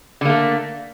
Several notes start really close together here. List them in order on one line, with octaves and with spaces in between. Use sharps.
D3 A#3 A3